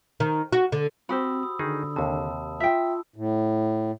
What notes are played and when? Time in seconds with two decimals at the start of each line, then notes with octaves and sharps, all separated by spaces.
0.20 D#3
0.53 F#4
0.72 D3
1.09 C4 F#4 G4 C5 B5 D#6 E6
1.43 D#6
1.59 D3 D#3 D#4 G#4
1.96 D#2 C3 A5
2.60 F4 E5 G5 E6
3.16 A2